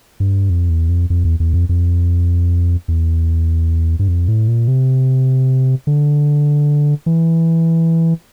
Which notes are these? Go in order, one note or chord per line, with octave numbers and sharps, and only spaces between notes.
G2
F2
E2
F2
F2
E2
E2
F2
F2
E2
G2
F2
A2
A#2
C3
D3
E3